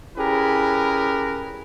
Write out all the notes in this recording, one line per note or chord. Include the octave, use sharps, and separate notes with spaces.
C#4 E4 G4 G#4 A#4 B4